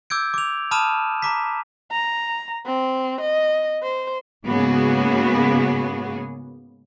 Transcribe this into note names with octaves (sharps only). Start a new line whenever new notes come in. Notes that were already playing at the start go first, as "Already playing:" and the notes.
D6 E6 G6 G#6 D7
D6 F7
A5 B5 D#6 F6 D#7 E7
A#5 D6 B6
A#5
C4
D#5
C5
G#2 C#3 A#3 B3 F#4 G#4